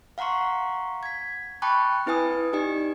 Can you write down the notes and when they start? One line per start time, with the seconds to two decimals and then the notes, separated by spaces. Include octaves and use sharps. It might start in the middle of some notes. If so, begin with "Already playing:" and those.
0.18 F5 F#5 A#5 C6 C#6
1.03 G#6 B6
1.62 G5 A5 B5 C#6 D6 F#6
2.06 C4 E4 B4 G#5 D#6
2.53 D#4 G4 D5 G#5